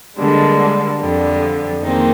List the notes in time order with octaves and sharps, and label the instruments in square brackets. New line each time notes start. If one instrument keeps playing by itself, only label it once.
[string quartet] D3 G3 A#3 D4 [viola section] G#3
[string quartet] F2 D3 G3
[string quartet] F2 D#3 G#3 C4 D#4 [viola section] A#3